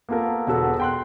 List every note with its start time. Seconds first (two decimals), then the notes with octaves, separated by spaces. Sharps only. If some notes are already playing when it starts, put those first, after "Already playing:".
0.09 A#3 B3 F4 A4 A#4
0.47 E1 D3 B3 F#4 A4 E6
0.80 G5 C6 F#6